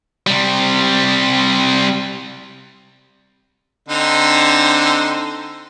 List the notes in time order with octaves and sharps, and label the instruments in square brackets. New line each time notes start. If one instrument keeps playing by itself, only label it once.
[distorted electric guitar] C3 G3
[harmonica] D3 C4 D#4